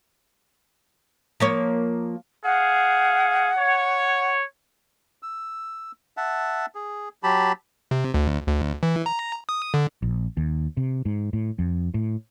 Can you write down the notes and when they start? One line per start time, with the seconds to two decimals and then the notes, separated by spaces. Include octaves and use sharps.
1.40 F3 A#3 C#5
2.44 G#4 F5 F#5
3.58 C#5
5.23 E6
6.17 E5 F#5 A5
6.75 G#4
7.23 F#3 G4 A5 B5
7.91 C3
8.14 D2
8.48 D2
8.83 E3
9.06 A#5
9.49 D#6
9.74 D3
10.02 A#1
10.37 D#2
10.77 C3
11.05 G#2
11.33 A2
11.59 F2
11.94 A2